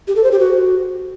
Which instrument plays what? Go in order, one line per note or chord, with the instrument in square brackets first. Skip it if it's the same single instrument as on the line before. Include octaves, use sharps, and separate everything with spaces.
[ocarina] G4
A4
C5
G4
F#4